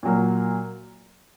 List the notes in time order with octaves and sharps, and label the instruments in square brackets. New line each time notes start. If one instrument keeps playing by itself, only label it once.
[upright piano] A#2 F#3 A#3